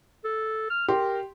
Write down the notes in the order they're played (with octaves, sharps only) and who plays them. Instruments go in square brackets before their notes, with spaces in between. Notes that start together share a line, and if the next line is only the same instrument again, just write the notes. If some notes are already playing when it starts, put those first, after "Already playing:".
[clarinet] A4
F6
[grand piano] G4 C6 [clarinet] A#4